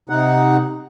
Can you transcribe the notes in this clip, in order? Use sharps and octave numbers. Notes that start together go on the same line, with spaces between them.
C3 D#4 F#5